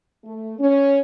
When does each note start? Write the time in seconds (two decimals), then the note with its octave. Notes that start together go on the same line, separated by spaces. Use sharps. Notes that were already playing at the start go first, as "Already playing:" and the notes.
0.24 A3
0.60 C#4